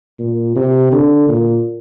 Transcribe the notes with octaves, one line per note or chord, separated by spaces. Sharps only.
A#2
C3
D3
A#2